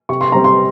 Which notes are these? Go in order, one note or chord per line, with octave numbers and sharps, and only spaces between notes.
C3 C#6
C6
G3 C4 A#5
C6